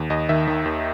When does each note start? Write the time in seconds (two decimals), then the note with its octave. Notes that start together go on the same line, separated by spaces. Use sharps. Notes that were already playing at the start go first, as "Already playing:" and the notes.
Already playing: D#2
0.10 D#2 D#5
0.29 D#3 E5
0.48 D#3
0.66 D#2